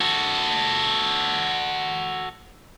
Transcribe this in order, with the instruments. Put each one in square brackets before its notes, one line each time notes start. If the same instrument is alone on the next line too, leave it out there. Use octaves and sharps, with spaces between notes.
[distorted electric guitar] F#4 A4